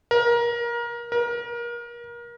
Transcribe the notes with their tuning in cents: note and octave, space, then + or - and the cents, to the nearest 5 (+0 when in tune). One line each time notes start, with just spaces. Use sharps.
A#4 +25
A#4 +30